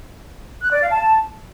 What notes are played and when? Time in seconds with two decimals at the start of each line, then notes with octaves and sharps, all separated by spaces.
0.62 F#6
0.72 D5
0.81 F5
0.91 A5